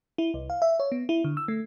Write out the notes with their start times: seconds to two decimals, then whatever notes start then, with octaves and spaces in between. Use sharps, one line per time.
0.18 E4
0.34 C2
0.50 F5
0.62 E5
0.80 C#5
0.92 B3
1.09 E4
1.24 D3
1.37 E6
1.48 A3